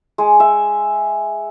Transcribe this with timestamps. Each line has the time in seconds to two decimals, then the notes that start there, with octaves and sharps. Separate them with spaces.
0.18 G#3
0.40 E5